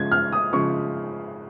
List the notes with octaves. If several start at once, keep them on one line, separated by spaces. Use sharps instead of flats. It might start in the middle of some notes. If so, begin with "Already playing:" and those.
Already playing: C#3 F3 G#3 G#6
F6
D#6
C#3 F3 G#3 C#6